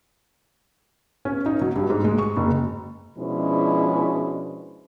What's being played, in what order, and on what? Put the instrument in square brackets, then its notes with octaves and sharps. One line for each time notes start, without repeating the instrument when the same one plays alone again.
[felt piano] C#4
D#4
F#3
G2
G#2
G#3
C#6
F#1
[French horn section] B2 F3 G#3 C#4 D4 E4